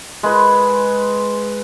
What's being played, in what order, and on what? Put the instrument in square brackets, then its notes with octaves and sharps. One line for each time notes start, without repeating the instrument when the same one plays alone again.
[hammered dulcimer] G#3 B4